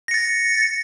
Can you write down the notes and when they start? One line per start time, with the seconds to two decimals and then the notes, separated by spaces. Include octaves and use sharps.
0.08 A#6
0.11 C#7
0.14 A6